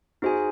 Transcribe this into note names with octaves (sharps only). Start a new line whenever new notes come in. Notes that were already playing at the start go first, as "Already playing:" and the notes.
D#4 F#4 G#4 C5 D#5 G#5